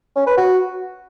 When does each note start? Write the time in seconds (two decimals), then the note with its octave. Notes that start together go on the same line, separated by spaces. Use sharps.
0.16 C#4
0.27 B4
0.37 F#4